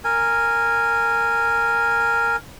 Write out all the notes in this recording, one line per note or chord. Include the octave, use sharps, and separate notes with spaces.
A#4 G#5